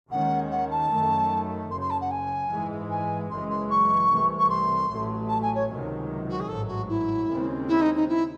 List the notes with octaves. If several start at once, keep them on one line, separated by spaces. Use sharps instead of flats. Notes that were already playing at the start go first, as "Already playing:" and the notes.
D#2 D#3 G#3 C#4 F#5
F#5
A5
F#2 D#3 A3
F#1 F#2 C#3 C6
C6
A5
F#5
G#5
G#2 E3 G#3
G#5
F#1 F#2 E3 G#3 C6
C6
C#6
C2 C3 E3 A3
C#6
C6
A1 A2 F#3 A3
A5
G#5
C#5
C#2 C3 D#3 F#3
F#4
G#4
A1 G#2 F#3 A4
F#4
E4
D#2 C#3 G#3 C4
E4
D#4
D#4
E4